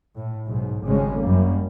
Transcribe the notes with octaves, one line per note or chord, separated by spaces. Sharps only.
A2
B1 G#2 B2
G#1 C#3 G3 G#3 C#4
F#2 G3 A#3